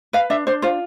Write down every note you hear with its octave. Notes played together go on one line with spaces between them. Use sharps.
B4 F5
D4 E5
D4 C5
F4 C5